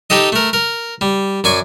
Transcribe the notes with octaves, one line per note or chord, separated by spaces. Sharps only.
D#4 G4 A4 D#5
A3 A#4
A#4
G3
F#2 D5 G#5 C#6